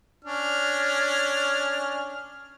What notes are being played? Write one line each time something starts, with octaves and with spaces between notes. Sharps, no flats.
C#4 D4 F6